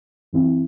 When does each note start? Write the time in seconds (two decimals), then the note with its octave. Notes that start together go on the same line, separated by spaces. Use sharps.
0.33 F#2 E3 C4 E4